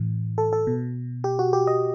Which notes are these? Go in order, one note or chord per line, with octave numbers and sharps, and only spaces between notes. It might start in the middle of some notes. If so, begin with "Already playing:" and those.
Already playing: A2 E3
A4
A4
B2
G4
F#4
G4
D#5